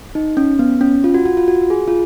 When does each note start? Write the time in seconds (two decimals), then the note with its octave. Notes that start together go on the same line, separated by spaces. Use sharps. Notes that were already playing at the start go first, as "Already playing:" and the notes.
0.15 D#4
0.37 C#4
0.59 B3
0.81 C#4
1.04 F4
1.14 F#4
1.25 F#4
1.37 F4
1.48 F#4
1.70 G#4
1.88 F4